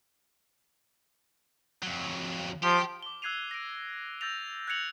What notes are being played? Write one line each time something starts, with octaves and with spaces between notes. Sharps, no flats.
F2 F#3
F3 G4
D6 G7
E6 F#6 G#6 C7 D#7 F7
A#6 D7
E6 G6 A6 A#6 F7
F#6 G#6 A#6 C#7 F7 F#7